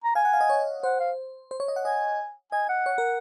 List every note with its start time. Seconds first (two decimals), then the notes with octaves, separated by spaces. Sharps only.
0.04 A#5
0.15 F5 G#5
0.25 F#5
0.33 F5
0.41 D#5
0.50 C#5
0.83 C5 F#5
1.00 F5
1.51 C5
1.60 C#5
1.68 D#5
1.76 F#5
1.85 D#5 G#5
2.52 D#5 G#5
2.69 F#5
2.86 C#5
2.98 A#4